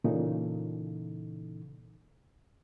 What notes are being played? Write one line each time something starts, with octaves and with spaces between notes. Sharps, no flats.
A#2 C#3 E3 D#4 A4